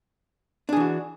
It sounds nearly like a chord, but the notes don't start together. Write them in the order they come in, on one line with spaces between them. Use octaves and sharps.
D4 G#4 E3 F#4